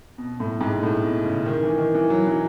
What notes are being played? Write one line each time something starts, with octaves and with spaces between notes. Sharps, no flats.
B2
A2
G#2
A2
B2
C#3
D#3
E3
D#3
E3
F#3
E3